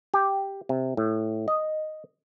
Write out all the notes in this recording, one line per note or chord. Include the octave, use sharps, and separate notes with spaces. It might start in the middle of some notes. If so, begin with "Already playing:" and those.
G4
C3
A2
D#5